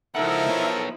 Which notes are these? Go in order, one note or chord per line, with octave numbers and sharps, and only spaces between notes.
C#2 F3 D#4 E4 A4 A#4 E5 F#5
B3 C#5